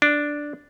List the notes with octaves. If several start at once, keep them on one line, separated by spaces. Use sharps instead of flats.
D4